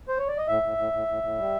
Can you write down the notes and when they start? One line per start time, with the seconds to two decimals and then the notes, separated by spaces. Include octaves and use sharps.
0.09 C5
0.18 C#5
0.28 D5
0.38 D#5
0.47 A2 E5
0.63 A2
0.78 A2
0.93 A2
1.08 A2
1.23 A2
1.38 G3